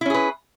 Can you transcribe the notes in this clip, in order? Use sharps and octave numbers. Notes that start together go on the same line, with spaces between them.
C#4 E4 G#4 B4